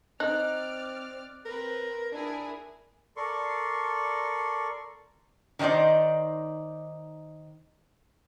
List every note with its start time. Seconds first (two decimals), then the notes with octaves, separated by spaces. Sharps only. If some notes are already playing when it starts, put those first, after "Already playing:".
0.20 C4 D#4 D5 F6 F#6
1.45 C4 A#4 B4
2.12 D4 E4 G#4 A#4
3.17 A4 A#4 D5 C6 C#6
5.59 D#3 D4 D#4 C5 D5